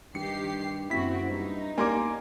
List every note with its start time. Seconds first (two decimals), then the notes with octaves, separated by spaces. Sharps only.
0.15 G2 D#3 G4 C7 C#7
0.90 F#1 F#2 C4 E4 F#4 B6
1.30 G2 D#4
1.78 D#2 G3 A#3 G#5 C6 D6